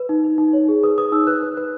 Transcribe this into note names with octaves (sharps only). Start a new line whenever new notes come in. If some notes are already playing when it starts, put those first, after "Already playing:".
Already playing: B4
D#4
D#4
D#4
C#5
G#4
B4 D#6
B4 D#6
D#4 E6
B4 F#6
B4
B4